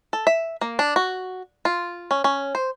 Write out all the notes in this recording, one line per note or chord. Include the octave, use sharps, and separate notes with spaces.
A4
E5
A#3
D4
F#4
F4
C#4
C#4
C5